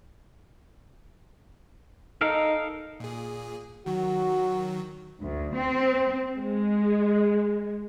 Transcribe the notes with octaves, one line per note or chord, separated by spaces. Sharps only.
D#4 A4 A#4 F5
A#2 G#4
D#3 F#3 F#4
D2
C4
G#3